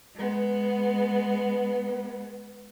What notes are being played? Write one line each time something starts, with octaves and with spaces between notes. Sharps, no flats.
G#3 B3